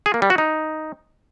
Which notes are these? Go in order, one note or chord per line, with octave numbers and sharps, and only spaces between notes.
G#4
A#3
G3
F#4
D#4